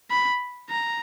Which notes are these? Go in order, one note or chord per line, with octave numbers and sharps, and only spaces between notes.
B5
A#5